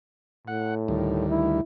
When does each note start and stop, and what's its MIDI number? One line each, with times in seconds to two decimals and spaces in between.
0.48 1.28 45
0.48 0.75 78
0.88 1.61 38
0.88 1.61 51
0.88 1.61 55
1.29 1.61 64